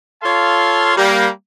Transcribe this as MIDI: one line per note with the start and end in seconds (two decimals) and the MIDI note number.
0.23 0.94 65
0.23 0.94 69
0.23 0.94 73
0.23 0.94 77
0.23 0.94 81
0.23 0.94 84
0.97 1.27 55
0.97 1.27 58